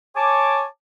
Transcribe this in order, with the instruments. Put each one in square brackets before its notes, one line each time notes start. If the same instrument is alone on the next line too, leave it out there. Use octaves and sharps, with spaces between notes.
[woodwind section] C#5 G#5 A5 D6